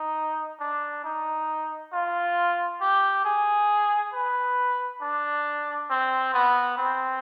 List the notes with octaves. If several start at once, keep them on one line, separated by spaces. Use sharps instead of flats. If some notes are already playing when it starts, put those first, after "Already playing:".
Already playing: D#4
D4
D#4
F4
G4
G#4
B4
D4
C4
B3
C4